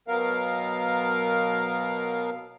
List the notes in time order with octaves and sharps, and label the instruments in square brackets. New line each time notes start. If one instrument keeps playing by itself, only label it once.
[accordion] B2 F#3 B3 A#4 F5